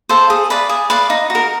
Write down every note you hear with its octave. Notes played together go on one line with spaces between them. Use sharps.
A4 C5 F5
G#4
B4 D5 F5
G#4
B4 D5 F5
D#4
F#4
A#4